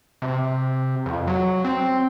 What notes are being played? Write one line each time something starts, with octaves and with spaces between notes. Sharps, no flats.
C3
F2
F#3
C4